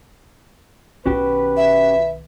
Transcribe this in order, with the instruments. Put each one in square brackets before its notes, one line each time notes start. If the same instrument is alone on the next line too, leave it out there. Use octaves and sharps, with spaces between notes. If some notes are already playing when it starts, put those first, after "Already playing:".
[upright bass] B1 D#3 [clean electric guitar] C#4 F#4 G4 [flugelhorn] B4
[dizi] E5